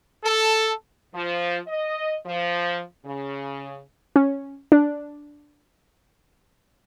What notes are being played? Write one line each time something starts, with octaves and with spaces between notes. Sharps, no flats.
A4
F3
D#5
F3
C#3
C#4
D4